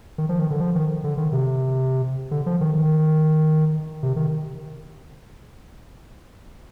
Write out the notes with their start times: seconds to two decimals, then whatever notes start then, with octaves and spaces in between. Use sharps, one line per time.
0.18 D#3
0.29 F3
0.39 D#3
0.50 D3
0.61 F3
0.75 D#3
1.04 D3
1.17 D#3
1.32 C3
2.31 D3
2.46 F3
2.61 D#3
2.75 D#3
4.03 C3
4.16 D#3